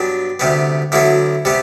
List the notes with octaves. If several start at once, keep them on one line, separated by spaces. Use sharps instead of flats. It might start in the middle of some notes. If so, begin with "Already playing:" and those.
Already playing: G2 F#3 B3 D4
D2 C3 G3 B3
D2 D3 F#3 B3 E4
C3 G3 B3